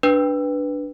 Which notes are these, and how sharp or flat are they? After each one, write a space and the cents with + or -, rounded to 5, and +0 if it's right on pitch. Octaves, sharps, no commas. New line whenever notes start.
D4 +0 B4 +0